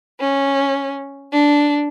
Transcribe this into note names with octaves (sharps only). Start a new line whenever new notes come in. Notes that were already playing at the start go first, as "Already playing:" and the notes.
C#4
D4